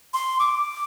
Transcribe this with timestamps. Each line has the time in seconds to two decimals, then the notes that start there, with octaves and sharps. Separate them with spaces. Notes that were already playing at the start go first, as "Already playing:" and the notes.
0.14 C6
0.40 D6